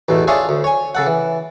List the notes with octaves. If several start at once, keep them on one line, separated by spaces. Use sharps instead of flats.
A1 E2 B2 A3
D4 F4 G#4 C#5 E5
D2
C#5 G#5
C#3 A4 F#5
E3